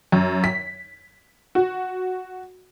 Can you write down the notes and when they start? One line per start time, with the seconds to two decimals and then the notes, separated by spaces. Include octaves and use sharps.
0.12 F#2
0.44 B6
1.55 F#4